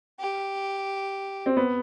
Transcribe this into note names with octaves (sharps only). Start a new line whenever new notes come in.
G4
C4
B3